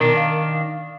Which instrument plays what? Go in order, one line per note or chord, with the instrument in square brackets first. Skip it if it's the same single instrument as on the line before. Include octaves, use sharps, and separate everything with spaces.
[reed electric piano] B2 A#4 [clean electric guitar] D#3 D4
[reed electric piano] F5